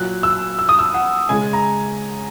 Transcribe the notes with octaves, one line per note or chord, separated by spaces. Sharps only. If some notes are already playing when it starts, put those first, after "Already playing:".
Already playing: A#2 F#3 F#6
E6
E6
D#6
E6
F#5
C#3 G#3 G#5
A#5